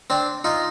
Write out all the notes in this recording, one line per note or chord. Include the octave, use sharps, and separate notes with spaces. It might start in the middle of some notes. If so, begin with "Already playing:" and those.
C4 D4
D#4 F4